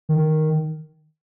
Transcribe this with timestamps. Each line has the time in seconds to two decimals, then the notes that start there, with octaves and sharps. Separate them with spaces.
0.09 D#3